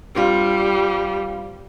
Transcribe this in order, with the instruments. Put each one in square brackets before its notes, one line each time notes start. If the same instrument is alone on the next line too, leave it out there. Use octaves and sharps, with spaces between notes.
[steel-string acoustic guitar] G2 C4 F4 [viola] G3